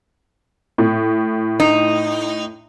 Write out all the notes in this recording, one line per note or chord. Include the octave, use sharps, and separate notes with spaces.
A2
D#4